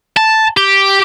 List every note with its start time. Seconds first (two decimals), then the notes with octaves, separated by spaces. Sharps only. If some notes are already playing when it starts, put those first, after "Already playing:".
0.17 A5
0.57 G4